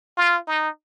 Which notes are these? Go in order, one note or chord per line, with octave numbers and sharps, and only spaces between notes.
F4
D#4